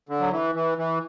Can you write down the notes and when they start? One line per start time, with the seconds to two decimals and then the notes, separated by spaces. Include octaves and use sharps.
0.09 D3
0.21 F#3
0.32 E3
0.55 E3
0.78 E3